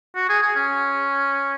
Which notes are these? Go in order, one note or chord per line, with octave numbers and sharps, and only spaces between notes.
F#4
G#4
G#4
C#4